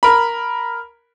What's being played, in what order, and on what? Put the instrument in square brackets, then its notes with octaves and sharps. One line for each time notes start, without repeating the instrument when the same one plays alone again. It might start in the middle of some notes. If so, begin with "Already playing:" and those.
[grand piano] A#4 B5